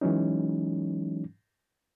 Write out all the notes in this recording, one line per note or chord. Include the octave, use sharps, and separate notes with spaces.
E3 F#3 G#3 C#4 D#4